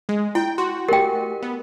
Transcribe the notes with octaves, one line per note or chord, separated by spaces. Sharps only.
G#3
E4 G5
F#4 C6
A3 G4 A#4 G5
B3